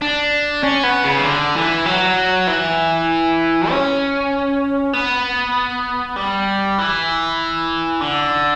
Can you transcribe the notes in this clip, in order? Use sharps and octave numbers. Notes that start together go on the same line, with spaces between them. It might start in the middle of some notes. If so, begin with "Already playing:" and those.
D4
C#4
B3
C#3
E3
D3
E3
F#3
E3
C#4
B3
G3
E3
D3